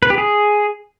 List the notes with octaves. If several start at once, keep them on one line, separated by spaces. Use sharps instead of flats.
B4
G4
G#4